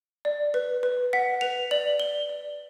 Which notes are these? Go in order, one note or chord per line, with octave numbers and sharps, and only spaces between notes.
D5
B4
B4
F#5 B6
B4 F7
D5 F#7
D5 G7
D5